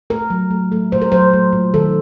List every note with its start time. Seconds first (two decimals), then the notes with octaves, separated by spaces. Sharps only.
0.10 A3 A#4
0.30 F#3
0.50 A3
0.72 A3
0.92 A#2 C5
1.02 A#4
1.12 F#3 C5
1.33 A3
1.53 A#2
1.74 D#3 A4